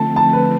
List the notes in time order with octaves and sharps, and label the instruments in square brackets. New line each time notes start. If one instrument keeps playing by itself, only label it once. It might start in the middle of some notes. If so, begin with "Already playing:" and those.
Already playing: [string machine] D3 F3 A3 C4 [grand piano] A5
[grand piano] A5
B4